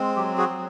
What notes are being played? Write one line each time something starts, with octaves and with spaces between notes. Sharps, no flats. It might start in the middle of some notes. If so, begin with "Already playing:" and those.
Already playing: G#3 C4
F#3 G4
F#4 G#4
F#3